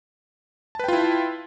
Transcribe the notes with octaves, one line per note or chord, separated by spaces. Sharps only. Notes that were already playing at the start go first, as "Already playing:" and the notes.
E4 F4 B4 G5 A5